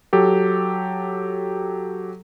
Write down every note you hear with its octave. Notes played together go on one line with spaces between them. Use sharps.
F#3 G4 A4